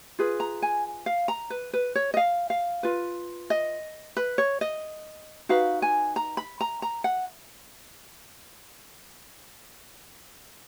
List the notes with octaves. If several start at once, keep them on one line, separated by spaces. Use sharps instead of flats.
F4 G#4 B4
A#5
G#5
F5
A#5
B4
B4
C#5
D#5
F5
F5
F4 B4
D#5
B4
C#5
D#5
D#4 F#4 B4 F5
G#5
A#5
B5
A#5
A#5
F#5